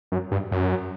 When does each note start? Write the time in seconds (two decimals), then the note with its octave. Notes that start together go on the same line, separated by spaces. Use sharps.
0.12 F#2
0.31 G2
0.52 F#2